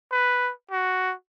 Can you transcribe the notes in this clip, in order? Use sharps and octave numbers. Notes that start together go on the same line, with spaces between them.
B4
F#4